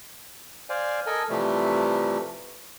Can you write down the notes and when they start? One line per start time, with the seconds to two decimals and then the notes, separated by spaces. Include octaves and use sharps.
0.69 C5 D5 F5 G#5
1.06 A4 A#4 D#5 G#5
1.30 C3 E3 F3 G3 A3